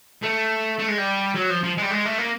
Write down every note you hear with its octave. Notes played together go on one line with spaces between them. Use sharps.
A3
A3
G#3
G3
F#3
F3
F3
G#3
G3
G#3
A3
A#3